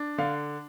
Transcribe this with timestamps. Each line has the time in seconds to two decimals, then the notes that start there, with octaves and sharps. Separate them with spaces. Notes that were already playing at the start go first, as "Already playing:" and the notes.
Already playing: D4
0.18 D3 F5